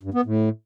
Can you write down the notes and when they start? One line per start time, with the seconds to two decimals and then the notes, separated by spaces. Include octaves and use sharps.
0.03 G2
0.14 B3
0.25 A2